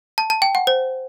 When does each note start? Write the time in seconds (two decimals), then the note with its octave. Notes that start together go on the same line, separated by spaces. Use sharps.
0.18 A5
0.30 A5
0.42 G5
0.55 F#5
0.67 C5